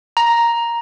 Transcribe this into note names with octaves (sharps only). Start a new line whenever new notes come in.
A#5